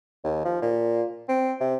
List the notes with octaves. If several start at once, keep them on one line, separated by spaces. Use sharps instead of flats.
D#2
F3
A#2
C4
C3